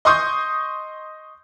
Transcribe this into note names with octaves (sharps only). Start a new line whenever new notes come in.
D#5 C6 C#6 D#6 G6